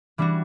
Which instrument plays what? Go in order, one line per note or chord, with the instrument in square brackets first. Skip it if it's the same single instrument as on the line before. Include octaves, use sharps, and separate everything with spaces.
[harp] E3 G3 D4 F#4